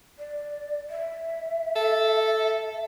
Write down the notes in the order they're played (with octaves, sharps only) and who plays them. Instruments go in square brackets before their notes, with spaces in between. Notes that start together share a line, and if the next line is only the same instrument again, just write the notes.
[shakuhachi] D5
E5
[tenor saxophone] A4